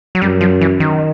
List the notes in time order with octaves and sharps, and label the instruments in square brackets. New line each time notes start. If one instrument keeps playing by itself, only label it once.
[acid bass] F#3
[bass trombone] F#2 [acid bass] G3
[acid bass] F3
E3
D#3